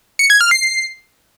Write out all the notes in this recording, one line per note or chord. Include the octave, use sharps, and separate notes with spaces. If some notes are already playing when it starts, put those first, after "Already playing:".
C#7
G#6
F6
C7